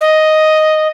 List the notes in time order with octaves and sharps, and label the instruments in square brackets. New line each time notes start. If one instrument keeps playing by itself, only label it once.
[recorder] D#5